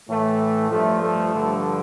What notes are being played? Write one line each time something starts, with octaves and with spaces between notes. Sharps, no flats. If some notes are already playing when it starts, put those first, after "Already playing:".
A2 E3 A3
G2 F3 A3
A3
G2 D3 F3